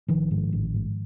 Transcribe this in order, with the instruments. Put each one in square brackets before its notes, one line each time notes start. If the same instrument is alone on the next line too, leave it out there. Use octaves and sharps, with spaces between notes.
[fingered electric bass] A1 D#3 F3
G#2
A1
G#2